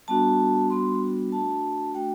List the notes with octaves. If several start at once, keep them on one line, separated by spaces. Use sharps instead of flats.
G3 B3 D4 F#4 A5
G3 B3 D4 F#4 C6
A3 D4 F#4 A5
A3 D4 F#4 G5